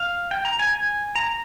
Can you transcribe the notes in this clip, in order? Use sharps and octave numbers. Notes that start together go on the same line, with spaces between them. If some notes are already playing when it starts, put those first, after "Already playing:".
Already playing: F5
G5
A#5
G#5
G#5
A#5